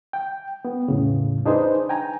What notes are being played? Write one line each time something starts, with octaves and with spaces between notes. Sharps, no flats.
G5
B3
E2 A2 C#3
D4 D#4 G#4 B4 C5
G5 G#5 A#5